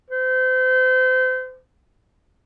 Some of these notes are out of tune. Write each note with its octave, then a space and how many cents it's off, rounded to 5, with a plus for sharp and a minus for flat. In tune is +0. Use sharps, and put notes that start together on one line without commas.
C5 -35